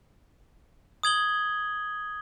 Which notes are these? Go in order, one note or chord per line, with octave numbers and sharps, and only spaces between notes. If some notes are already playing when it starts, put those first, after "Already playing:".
D#6 G#6 F#7 G7